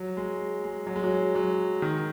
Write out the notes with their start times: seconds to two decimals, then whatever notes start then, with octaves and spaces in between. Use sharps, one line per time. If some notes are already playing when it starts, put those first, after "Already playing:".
Already playing: F#3
0.17 G#3
0.64 G#3
0.87 F#3
0.96 G#3
1.03 F#3
1.35 F#3
1.82 D#3